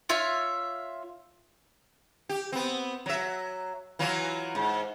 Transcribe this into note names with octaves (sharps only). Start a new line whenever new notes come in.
F4 C#5 E5 F5
G4
B3 C4
F#3 E5
E3 F#3 F4
G#2